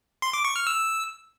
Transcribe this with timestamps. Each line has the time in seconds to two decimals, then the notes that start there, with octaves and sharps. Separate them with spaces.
0.22 C6
0.33 D6
0.45 C#6
0.56 F6
0.67 E6